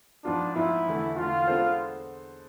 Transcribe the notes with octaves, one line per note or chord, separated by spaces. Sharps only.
G#2 F3 B3 D4 F4
G#2 F3 B3 E4 F4
E2 D3 A3
E2 D3 A3 F4
G#3 B3 D4 A4 C5